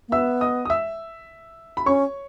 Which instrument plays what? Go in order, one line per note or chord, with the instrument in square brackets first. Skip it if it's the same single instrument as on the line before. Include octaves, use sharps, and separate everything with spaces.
[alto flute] A#3
[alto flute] B3 [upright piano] E5 E6
[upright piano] D#5 D#6
D#6
E5 E6
B5
[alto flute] C#4 [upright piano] C#5 C#6